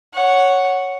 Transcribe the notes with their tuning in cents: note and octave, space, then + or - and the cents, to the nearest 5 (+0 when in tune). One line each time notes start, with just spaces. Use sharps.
C#5 +0 F#5 +0